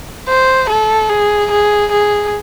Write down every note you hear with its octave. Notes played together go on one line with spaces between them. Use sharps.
C5
A4
G#4
G#4
G#4